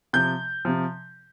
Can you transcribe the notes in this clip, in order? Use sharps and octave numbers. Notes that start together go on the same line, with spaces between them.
C3 F3 G6
C3 F3